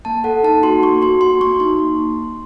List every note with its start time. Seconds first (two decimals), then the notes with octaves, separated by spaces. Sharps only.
0.05 A#3 A5
0.24 A4 F#5
0.43 D#4 A5
0.63 F#4 C6
0.83 A#3 C#6
1.02 F#4 C6
1.21 F#4 C6
1.41 A#3 C#6
1.60 D#4 C6